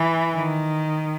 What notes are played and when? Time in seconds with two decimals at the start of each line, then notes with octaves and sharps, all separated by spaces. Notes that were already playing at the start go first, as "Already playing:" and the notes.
Already playing: E3
0.34 D#3